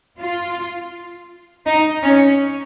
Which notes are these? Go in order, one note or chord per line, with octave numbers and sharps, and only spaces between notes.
F4
D#4
C#4